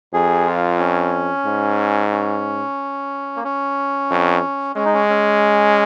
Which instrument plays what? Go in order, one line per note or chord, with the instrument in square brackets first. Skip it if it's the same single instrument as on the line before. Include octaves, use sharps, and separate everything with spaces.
[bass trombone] F2 [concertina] G#4
[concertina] F4
C#4
[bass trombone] G#2
[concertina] C#4
A#3
C#4
[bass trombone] F2
[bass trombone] G#3 [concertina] C#4
[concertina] D#4
C#4
C#4